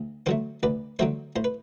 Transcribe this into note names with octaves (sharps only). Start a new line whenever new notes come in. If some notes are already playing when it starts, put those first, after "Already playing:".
Already playing: D2
D3 F#3 A3 A4 C5
D2 B4 D5
D3 F#3 A3 C5 E5
A2 C5
B4